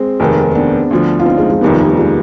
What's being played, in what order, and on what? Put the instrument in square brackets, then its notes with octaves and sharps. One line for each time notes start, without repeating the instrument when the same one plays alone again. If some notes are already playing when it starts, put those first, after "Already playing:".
Already playing: [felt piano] G#3 C4
[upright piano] F1 D#2 D#3
[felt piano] B3 D4
[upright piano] D2 D3 F3
[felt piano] F4
C4 D#4
G#3 C4
F3 G#3
[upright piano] F1 D#2 D#3 B3 [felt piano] G3
[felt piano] F3
G3
F3 G#3